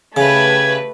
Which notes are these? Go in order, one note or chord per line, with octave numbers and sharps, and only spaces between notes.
C#3 A3 G4 B4 G#6